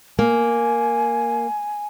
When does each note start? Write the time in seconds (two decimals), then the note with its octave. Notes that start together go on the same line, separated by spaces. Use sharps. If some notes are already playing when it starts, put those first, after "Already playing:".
0.19 A#3 G#5